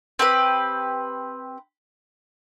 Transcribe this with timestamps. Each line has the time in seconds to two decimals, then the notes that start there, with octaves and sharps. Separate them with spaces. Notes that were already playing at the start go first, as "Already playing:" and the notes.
0.19 C4 G4 B4